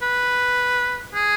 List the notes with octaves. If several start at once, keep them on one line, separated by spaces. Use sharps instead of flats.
B4
G#4